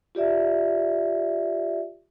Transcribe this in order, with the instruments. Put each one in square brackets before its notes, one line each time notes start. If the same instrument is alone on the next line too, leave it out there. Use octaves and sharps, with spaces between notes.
[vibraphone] F4 G4 D5 E5